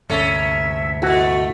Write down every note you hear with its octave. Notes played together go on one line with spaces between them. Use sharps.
D2 G2 C3 C#4 A4 E5
B2 A3 E4 F#4